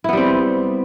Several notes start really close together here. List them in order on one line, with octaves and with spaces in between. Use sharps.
E4 B3 G3 C4